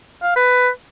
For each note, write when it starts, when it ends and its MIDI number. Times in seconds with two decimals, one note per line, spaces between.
0.23 0.34 77
0.36 0.69 71